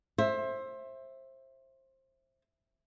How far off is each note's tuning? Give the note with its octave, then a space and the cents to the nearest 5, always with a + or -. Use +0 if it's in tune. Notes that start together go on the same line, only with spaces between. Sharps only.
C5 +25 E5 +0